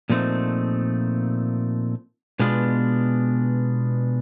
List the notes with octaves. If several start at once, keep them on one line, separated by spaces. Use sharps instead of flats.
A#2 F3 A3 C4 D#4
B2 G#3 B3 D4 F4